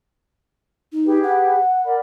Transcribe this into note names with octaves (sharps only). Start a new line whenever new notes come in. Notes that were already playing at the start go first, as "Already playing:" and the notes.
D#4
G4 G#4 B4
F#5
A#4 D5 B5